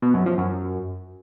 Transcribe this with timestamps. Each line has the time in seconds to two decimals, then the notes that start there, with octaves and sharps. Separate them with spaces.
0.02 B2
0.14 F#2
0.26 F3
0.38 F#2